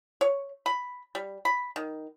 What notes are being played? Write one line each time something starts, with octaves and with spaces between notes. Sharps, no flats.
C#5
B5
G3
B5
D#3